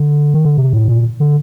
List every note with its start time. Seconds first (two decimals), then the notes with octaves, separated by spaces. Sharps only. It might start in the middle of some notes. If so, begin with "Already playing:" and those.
Already playing: D3
0.34 D#3
0.45 D3
0.57 C3
0.73 A2
0.88 A#2
1.20 D3